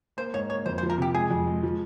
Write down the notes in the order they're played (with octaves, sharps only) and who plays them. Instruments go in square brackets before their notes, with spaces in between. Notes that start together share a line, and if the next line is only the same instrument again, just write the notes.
[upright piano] A#3 [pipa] C5
[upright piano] G#2 [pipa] C#5
[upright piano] A#3 [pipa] C#5
[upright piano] F2 [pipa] C5
[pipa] C5
[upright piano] F3
[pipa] A#4
[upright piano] C3 [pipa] G4
[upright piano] G#3 [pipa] G#4
[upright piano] F2
G#3
F3